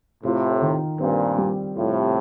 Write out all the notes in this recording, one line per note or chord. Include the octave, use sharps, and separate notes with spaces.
A2 C3 F4
D#3
G2 A#2 C4
G3
A2 C3 F4